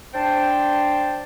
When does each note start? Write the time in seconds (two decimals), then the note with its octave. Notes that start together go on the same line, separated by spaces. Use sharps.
0.14 D4 C5 G5 A5